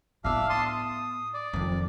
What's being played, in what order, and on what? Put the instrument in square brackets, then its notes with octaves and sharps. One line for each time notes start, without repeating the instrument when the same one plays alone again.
[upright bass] A2 B3 [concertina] D4 E5 F5
[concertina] A5 C6 D#6
D#6
D5
[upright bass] F2 D#3